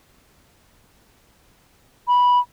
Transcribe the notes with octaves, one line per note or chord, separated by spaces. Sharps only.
B5